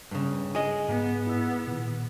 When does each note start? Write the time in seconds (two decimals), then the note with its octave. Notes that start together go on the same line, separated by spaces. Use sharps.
0.11 G2 C#3
0.55 G#4 D#5
0.89 G#2 B3
1.27 E4 E6
1.67 A#2 D#3